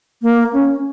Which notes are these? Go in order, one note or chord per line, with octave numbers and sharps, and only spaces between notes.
A#3
C#4